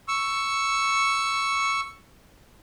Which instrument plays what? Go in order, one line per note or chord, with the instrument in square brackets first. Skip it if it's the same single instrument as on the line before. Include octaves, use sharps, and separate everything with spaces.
[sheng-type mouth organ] C#6 E6